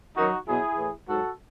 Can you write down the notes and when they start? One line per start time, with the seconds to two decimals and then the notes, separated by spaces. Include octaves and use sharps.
0.16 F#2 D#3 F#3 D#4 F#4
0.47 B2 F#3 E4 G#4
0.77 A2 E3
1.08 G#2 F#3 F#4 A4